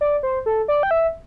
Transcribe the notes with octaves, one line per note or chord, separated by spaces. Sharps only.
D5
C5
A4
D5
G5
E5